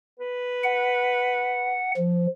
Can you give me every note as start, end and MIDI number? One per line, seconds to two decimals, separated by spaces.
0.19 1.79 71
0.64 1.92 78
1.97 2.27 53